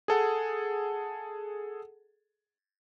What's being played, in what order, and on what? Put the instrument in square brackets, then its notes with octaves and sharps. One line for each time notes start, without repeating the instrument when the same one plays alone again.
[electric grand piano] G#4 A4 F#5